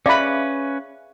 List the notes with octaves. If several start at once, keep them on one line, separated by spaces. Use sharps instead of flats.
C#4 G#4 B4 D5 E5 F5 B5